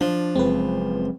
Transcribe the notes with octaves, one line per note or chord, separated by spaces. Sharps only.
F3 D4
F#1 F#2 G#3 C4 B4